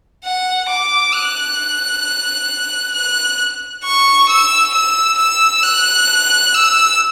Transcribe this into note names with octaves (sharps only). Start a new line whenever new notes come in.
F#5
D6
F#6
F#6
C#6
E6
E6
E6
F#6
E6